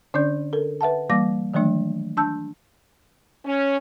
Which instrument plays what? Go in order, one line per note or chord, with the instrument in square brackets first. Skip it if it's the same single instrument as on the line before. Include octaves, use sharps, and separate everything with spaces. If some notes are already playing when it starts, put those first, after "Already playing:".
[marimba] D3 C#4 D4 D5 G6
A4 A#4
B4 E5 F#5 A5
E3 G3 A#3 D6 A#6
D#3 E3 F#3 A3 D4
D4 A5 E6 G6
[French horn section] C#4